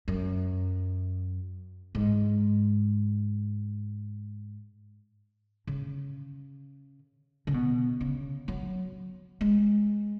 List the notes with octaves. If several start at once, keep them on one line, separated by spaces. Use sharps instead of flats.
F#2
G#2
C#3
C#3
B2
C#3
F#3
G#3